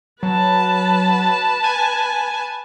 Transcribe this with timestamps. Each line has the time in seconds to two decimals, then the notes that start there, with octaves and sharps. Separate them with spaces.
0.23 F#3 B4 A5
1.64 G#5